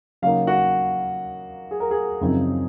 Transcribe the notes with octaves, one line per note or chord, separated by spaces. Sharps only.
C#3 F#3 A#3 D#4 F5
F#4
G#4
A#4
G#4
F#2 C#3 F3 C4 D#4